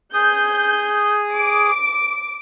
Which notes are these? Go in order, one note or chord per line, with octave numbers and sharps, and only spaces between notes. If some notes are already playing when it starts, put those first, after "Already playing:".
G#4 D#6 G6
D6 D7